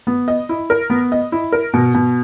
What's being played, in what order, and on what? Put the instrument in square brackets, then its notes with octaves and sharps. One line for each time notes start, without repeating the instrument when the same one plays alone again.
[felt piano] B3
D#5
E4
A#4
B3
D#5
E4
A#4
B2
B2